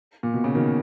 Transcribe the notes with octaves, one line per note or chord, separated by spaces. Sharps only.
A#2
B2
C#3
B2 D#3